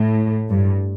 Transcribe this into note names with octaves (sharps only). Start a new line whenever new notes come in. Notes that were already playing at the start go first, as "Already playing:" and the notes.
Already playing: A2
G2